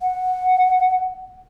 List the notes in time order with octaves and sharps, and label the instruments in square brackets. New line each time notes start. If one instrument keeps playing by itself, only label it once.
[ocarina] F#5